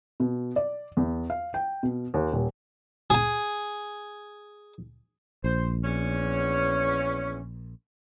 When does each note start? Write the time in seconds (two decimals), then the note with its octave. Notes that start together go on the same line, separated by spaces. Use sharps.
0.20 B2
0.56 D5
0.97 E2
1.30 F5
1.54 G5
1.83 B2
2.14 D#2
2.33 D#1
3.10 G#4 G#5
5.44 A#1 C5
5.84 E2 C#4